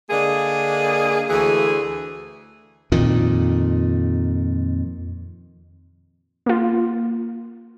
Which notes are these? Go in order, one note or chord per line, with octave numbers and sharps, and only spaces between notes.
D3 A#3 D4 G#4 D#5
D2 E3 A3 G#4
F2 A#2 D#3
A#3 F4